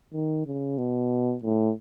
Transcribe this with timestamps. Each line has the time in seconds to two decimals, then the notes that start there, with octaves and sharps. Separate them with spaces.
0.13 D#3
0.46 C#3
0.78 B2
1.43 A2